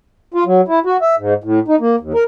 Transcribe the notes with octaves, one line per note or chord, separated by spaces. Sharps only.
F4
F#3
E4
F#4
E5
G#2
A2
D#4
A#3
D#2
A#4